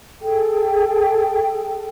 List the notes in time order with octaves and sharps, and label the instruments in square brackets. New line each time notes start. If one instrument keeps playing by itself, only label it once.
[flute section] G#4 A4 G5